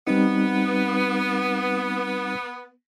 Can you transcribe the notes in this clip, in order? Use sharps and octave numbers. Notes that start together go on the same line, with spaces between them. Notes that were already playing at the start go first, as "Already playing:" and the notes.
G3 B3 C4 D#4